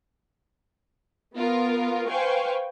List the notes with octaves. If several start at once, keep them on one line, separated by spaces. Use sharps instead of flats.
B3 F4 A#4
B4 C5 F5 G5 G#5 C#6